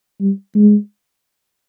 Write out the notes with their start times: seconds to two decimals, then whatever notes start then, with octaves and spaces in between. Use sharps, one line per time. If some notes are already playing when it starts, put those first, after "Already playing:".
0.20 G3
0.55 G#3